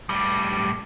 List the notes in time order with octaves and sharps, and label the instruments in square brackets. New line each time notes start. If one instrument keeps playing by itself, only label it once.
[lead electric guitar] A2 G3